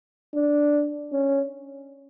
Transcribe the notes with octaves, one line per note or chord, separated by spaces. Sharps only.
D4
C#4